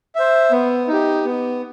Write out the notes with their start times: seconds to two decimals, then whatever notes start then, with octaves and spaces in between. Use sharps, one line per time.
0.15 C5 E5
0.52 B3
0.88 D#4 G4
1.25 B3